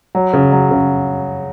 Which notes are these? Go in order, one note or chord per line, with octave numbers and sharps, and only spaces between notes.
F#3
C#3
F#3
C#3